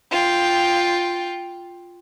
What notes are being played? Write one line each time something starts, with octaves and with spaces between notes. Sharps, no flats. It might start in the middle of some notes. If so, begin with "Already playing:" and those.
F4 G5